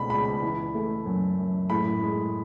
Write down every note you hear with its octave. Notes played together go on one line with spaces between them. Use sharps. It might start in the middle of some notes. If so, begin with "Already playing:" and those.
Already playing: C#2 B2 A3 B5
C#2 B5
E3
A3
F#2
F#2
A2 B5
G#3